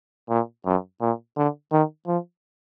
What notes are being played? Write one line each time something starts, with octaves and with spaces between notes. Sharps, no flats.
A#2
F#2
A#2
D3
D#3
F3